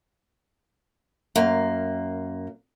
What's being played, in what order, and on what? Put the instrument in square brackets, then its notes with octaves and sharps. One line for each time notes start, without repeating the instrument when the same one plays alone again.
[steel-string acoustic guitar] F#2 A#3